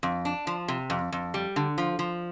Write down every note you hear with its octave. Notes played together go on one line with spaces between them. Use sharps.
F2
D4
F3
C3
F2
F2
G3
D3
F3
F3